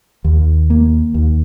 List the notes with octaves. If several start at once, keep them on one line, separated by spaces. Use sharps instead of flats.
D#2
A#3
D#2